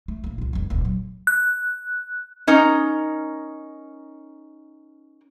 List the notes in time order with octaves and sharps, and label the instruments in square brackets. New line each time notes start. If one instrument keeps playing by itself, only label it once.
[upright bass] A3
A#1 A#3
C2 F4
F1 G3
D#1 C#2
F#3
[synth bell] F#6
[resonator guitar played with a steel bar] C#4 D#4 A#4